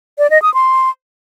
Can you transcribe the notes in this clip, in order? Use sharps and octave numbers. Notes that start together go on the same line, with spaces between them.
D5
D#5
D#6
C6